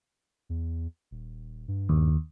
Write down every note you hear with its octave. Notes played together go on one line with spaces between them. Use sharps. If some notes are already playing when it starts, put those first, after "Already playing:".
E2
D#1
G2
D#2